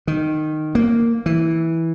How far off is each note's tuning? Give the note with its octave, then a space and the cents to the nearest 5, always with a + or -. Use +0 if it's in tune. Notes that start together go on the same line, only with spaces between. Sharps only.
D#3 -10
A#3 -5
E3 -10